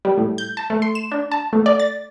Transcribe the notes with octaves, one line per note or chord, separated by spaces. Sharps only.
G3
A2
G6
A5
A3
C6
E7
D4
A5
A3
D5
A6